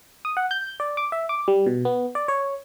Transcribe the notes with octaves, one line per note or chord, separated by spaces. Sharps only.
D#6
F#5
G6
D5
D6
E5
D6
G3
B2
B3
D5
C#5